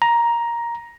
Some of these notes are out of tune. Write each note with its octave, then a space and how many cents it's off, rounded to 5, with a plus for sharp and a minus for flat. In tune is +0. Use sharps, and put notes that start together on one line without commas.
A#5 +10